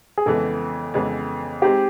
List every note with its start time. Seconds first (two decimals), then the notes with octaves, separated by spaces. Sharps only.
0.18 G#4
0.26 F2 C#3 E3 G#3 B3 A4
0.94 F2 C#3 E3 G#3 B3
1.62 G#3 C4 D#4 G4 G#4